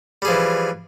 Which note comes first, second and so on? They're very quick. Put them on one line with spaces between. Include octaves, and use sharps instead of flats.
G3 G#4 F3 E3